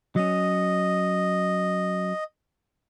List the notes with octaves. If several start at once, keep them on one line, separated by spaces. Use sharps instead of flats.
F#3 C#4 D#5